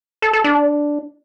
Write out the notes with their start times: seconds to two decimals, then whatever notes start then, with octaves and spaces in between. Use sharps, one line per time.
0.22 A4
0.33 A4
0.44 D4